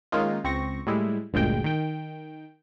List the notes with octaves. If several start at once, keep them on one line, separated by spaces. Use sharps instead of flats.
D#3 G#3 A#3 C#4 D#4 F4
C#2 C4 C#6 A#6
A2 G3 G#3 E4
G1 D2 A#2 G#3 G5
D#3 G5